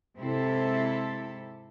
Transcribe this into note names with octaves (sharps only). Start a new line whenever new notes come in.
G#2 C3 C4 E4 G4 A4